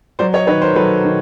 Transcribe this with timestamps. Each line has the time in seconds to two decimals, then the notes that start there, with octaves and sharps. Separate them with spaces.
0.19 F#3 C5 D5
0.33 C#5 D#5
0.47 D#3 B4 C#5
0.62 A#4 C5
0.76 F#3 A4 B4
1.05 D#3